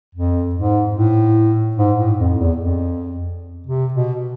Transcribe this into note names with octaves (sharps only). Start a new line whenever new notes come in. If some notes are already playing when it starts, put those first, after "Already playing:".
F2
G#2
A2
G#2
A2
F2
E2
F2
C3
B2